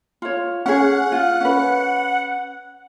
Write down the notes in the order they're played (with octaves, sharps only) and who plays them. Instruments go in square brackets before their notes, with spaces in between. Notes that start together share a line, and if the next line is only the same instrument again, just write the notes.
[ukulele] F4 C#5
[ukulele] C#4 G#4 [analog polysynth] F#5
[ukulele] F4
C#4 B4